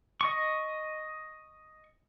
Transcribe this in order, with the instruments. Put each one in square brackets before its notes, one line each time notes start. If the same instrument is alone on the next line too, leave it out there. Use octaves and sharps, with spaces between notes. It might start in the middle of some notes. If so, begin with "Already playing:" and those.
[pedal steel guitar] D#5 C#6